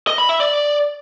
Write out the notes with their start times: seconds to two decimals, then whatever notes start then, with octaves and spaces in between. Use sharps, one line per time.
0.07 D#5
0.18 B5
0.29 E5
0.40 D5